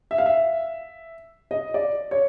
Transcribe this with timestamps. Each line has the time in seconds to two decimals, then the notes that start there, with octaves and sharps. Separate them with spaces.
0.11 E5
0.18 F5
0.26 E5
1.51 D#5
1.74 D5
2.11 C#5